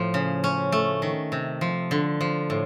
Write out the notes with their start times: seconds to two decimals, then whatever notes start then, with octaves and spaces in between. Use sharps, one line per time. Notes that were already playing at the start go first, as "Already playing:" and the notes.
Already playing: A2 F3
0.14 C#3
0.44 C#4
0.72 A3
1.02 D#3
1.32 C3
1.61 F3
1.91 D3
2.21 F3
2.50 A2